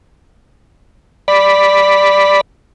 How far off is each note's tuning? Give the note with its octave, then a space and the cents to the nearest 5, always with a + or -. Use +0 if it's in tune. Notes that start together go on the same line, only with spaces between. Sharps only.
D5 +0 B5 +0